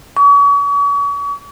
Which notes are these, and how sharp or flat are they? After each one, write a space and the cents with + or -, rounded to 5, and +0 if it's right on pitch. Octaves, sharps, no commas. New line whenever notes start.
C#6 +40